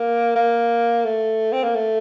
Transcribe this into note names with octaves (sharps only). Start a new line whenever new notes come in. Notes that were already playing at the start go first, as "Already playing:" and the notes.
Already playing: A#3
A#3
A3
C4
A#3
A3